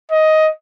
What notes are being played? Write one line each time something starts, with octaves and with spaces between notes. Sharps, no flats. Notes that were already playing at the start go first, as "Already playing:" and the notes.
D#5